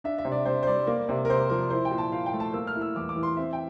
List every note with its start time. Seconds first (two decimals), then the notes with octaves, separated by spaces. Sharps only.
0.04 D4 E5
0.18 E5
0.25 C3
0.32 D5
0.45 C3 C5
0.63 C5
0.66 G3 D5
0.87 A#3
1.09 C3
1.25 A#4
1.29 C3 C5
1.50 F3 A#4
1.70 E4 C5
1.85 G5
1.91 A#2
1.98 A5
2.12 A#2 F5
2.26 G5
2.33 A3
2.40 A5
2.54 A#3 E6
2.67 F6
2.76 E4
2.82 E6
2.96 E2 D6
3.09 D6
3.16 E3
3.23 C6
3.37 C4 E5
3.53 G5